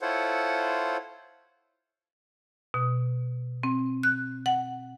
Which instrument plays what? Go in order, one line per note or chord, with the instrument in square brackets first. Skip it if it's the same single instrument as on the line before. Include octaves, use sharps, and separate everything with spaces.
[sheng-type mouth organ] E4 F4 A4 C5 C#5 F#5
[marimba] B2
C4
F#6
F#5